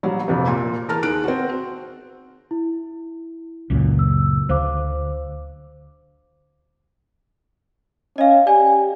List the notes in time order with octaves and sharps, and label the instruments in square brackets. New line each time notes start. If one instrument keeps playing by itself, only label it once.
[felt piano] A#1 F#3 G3
A#1 F2 C3
A#2
E2 A#4 A5 F6
D#2 G#4 F#6 D7
C4 F#4
[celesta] E4
[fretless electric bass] C#2 F#2 A#2
[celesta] E6
[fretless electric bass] D2 [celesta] C5 F5 D6
[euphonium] C#4 [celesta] D#5 F5
[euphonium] G4 [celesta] D5 G#5